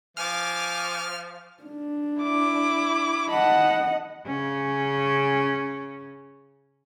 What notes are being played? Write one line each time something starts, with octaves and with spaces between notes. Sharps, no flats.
F3 G#5 D6 F6
D4
E4 D6
D#5 F#5 A5 B5
C#3 C#4